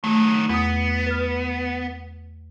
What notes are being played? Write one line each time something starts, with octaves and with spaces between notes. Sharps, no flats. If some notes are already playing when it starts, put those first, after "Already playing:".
D#3 F#3 A3
E2 B3 D#6
B4 F6